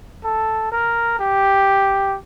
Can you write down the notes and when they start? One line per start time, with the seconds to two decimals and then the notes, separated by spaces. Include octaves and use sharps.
0.24 A4
0.72 A#4
1.19 G4